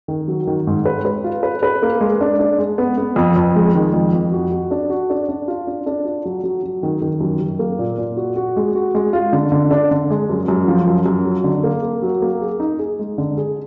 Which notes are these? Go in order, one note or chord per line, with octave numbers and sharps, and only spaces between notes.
D#3
F#3
D#3
G#2
B4
B4
F4
B4
B4
A#3
G#3
D4
D4
G#3
B3
B3
F2
F2
G#3
D#3
F2
F2
F#4
F#4
D4
F#4
D4
D4
F4
D4
D4
F4
F#3
F#3
F#3
D#3
D#3
F#2
F#2
A#3
A#2
A#2
F#4
F#4
G#3
F#4
G#3
F4
D3
D3
D4
D3
G#3
F#2
F#2
F3
F#2
F#2
F#3
D3
A#3
A#3
F#3
A#3
G#4
D#4
G#4
G#3
D3
G#4